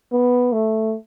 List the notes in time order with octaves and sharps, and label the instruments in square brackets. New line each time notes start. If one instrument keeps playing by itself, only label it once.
[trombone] B3
A3